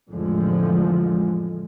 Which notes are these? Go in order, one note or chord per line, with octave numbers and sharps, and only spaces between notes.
A1 F2 A2 D3 F3 G#3